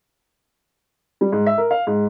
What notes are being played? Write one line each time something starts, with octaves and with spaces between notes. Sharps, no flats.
G3
G#2
E5
A#4
F5
G#2